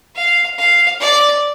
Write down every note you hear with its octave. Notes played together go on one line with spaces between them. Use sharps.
F5
F5
D5